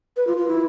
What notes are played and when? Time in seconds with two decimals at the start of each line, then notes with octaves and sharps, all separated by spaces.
0.17 B4
0.27 F4
0.37 F4
0.48 E4